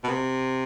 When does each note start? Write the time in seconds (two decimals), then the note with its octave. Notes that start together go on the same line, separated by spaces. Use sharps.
0.04 B2
0.09 C3